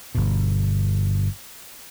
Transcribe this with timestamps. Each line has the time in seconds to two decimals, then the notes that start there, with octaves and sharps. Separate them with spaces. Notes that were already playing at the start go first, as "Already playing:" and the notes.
0.15 G1 B2